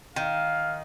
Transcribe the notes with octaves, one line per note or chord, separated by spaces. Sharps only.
D#3 F5